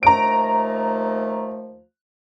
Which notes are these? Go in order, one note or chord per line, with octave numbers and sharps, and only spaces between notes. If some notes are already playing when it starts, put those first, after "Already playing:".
D#2 F3 A3 A#5 D7